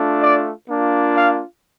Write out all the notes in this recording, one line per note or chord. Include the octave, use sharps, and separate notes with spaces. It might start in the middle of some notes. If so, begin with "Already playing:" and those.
Already playing: A3 D4 F4
D5
A#3 D4 F4
F5